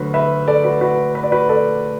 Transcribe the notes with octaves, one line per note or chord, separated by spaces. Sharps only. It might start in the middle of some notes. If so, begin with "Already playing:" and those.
Already playing: D2 D3 F#3 F#4 B4
B4 E5
A4 D5
F#4 B4
F#4 B4
B4
D5
F#4 B4
A4 D5